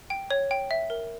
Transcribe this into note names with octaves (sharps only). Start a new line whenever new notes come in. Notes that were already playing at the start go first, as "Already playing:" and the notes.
G5
C#5
G5
E5
A#4